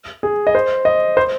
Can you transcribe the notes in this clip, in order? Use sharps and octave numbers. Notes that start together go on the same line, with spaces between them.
G#4
D#5
C5
D#5
C5